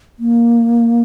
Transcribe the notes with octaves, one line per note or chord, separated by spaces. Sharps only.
A#3